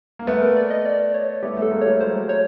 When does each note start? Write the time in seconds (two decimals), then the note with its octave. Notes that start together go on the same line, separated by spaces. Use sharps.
0.19 A#3
0.27 A3 B3 B4
0.42 A#4
0.56 D5
0.71 D#5
0.85 D5
1.14 C#5
1.43 A3 B3 G4
1.57 A3 B3 A4
1.71 G#3 A#3
1.82 G3 A3 C#5
2.00 F#3 G#3 C5
2.29 C#5